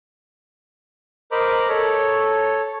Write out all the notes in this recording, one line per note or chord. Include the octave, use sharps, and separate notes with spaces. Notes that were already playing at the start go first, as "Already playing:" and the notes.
A#4 C5 D#5 A#5 B5 D6
A4 C#5